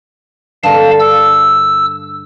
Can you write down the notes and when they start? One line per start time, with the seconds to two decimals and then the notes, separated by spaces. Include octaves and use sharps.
0.63 G2 D3 A#4 F5 A5
1.00 E6